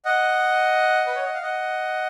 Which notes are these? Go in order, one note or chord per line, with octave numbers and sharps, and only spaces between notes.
D#5 F#5
B4
C#5
D#5
F5
D#5 F#5